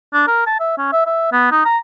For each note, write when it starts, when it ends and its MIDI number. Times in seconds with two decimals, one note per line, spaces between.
0.13 0.25 62
0.27 0.46 70
0.47 0.55 81
0.60 0.74 76
0.78 0.90 61
0.93 1.05 76
1.06 1.30 76
1.33 1.51 59
1.51 1.62 63
1.65 1.78 82